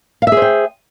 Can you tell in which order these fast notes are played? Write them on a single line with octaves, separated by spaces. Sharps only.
F5 E5 G#4 C5 G5